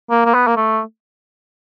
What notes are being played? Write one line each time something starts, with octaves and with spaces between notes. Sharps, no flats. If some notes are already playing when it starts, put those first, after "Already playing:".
A#3
A#3
B3
A#3
A3